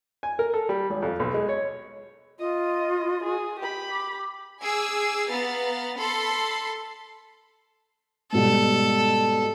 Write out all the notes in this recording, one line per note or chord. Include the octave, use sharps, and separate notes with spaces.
G#5
A#4
A4
G3
G#1
F2
B1
G#3
C#5
F4 D#5
G#4
G4 B5
D6
G#4 G#5 D6 E6
B3 F5 A#5 A6
A4 B5 C6
G#2 B2 G3 A4